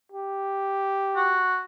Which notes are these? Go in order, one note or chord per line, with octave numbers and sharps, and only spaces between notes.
G4
F#4